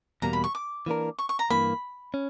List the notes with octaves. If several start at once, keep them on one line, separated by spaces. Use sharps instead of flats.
E2 B2 G3 A#3 A#5
B5
C#6
D6
E3 A#3 D4 A#4
C#6
C#6
A#5
G2 E3 A#3 B5
C#4